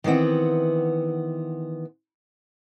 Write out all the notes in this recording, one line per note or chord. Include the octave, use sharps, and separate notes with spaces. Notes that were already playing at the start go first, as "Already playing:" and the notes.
D#3 E3 B3 C4 F#5